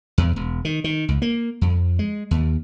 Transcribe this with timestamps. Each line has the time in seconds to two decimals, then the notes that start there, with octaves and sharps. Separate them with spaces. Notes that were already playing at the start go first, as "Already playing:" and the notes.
0.18 E2
0.36 E1
0.65 D#3
0.84 D#3
1.08 C#2
1.22 A#3
1.61 F2
1.99 G#3
2.31 D#2